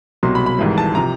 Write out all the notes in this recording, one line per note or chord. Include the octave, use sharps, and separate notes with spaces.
C2 B2 F#3 C6
B5
B5
G#1 G#2 E3 G3
A5
C3 F3 A#5